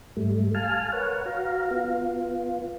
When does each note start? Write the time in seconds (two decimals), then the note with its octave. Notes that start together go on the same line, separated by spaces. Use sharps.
0.17 G#2 G3 A3
0.54 F5 G#5 A5 F6
0.92 A#4 B4 C#5 F#5
1.26 F#4 F5 A#5
1.71 B3 F4